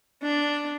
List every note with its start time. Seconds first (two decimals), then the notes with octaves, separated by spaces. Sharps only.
0.22 D4